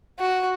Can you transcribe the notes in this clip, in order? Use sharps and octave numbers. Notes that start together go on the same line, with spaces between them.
F#4